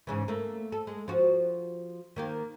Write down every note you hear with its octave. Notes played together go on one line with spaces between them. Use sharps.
G#2 C#3 E3
A3 A#3
A4
G#3
F3 F#4
D#3 A#3 G4